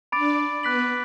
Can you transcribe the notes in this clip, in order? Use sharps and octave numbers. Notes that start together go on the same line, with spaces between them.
D4 D5 B5 D6 A6 D7
B3 B4 B5 F#6 B6 F#7